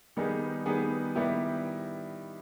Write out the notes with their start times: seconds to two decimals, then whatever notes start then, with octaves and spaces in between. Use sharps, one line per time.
0.17 D#3 G3 B3 D#4 G#4
0.66 D#3 G3 B3 D#4 G#4
1.15 D#3 G3 B3 E4 G4